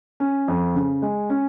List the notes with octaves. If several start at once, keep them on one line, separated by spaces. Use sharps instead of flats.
C#4
F2
C#3
G#3
C#4